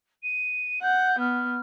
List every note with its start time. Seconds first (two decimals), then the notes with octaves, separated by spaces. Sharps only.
0.23 D#7
0.82 F#5 G6
1.19 B3 F6